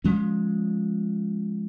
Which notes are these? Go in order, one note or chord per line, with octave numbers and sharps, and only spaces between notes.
F3 G#3 C#4